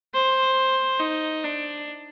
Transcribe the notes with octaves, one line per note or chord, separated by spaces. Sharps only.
C5
D#4
D4